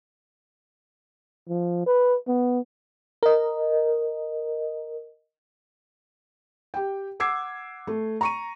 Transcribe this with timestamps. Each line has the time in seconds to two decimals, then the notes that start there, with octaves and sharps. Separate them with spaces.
1.48 F3
1.87 B4
2.27 B3
3.23 A#4 D#5
6.74 G4 G5
7.20 F#5 D6 E6 G#6 C7
7.87 A3
8.21 A#5 C#6 D#7